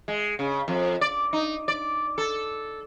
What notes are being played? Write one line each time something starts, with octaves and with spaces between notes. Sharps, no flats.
G#3
C#3
F2
D5
D#4
D5
A4